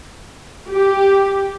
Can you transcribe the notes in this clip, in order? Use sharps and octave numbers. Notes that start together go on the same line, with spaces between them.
G4